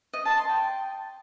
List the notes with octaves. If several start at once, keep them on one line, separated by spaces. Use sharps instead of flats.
D#5
A5
C6
G5